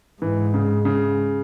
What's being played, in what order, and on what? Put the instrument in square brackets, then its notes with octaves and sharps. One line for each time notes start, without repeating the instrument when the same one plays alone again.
[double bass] G#2 [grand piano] E3
[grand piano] C#3
C#3